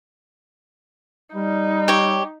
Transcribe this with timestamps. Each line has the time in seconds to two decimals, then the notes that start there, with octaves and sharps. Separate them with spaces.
1.34 G3 D#4
1.88 G4 C#5